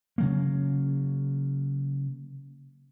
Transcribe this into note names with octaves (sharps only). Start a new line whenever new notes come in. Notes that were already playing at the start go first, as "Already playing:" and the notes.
C#3 F#3 A#3